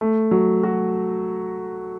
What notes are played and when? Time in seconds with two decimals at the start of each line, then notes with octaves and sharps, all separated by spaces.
0.01 A3
0.31 F#3
0.63 F#4